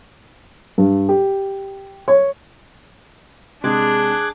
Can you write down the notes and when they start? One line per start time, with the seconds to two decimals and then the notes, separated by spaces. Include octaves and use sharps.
0.78 G2
1.09 G4
2.08 C#5
3.64 C3 G#3 D4 G#4 D6 F#6 G#6